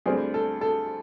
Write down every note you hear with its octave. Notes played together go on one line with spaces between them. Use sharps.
D2 D3 G3 C4 G#4
A4
A4